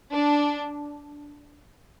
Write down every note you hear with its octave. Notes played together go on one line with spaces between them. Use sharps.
D4